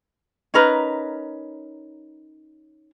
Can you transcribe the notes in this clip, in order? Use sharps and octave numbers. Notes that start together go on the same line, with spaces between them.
C#4 D#4 A#4 B4